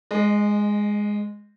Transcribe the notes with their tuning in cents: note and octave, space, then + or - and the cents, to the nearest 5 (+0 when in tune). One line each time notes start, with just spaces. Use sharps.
G#3 +0 D#5 -25